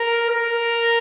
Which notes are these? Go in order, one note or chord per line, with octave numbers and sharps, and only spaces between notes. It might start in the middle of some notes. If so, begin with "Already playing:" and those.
Already playing: A#4
A#4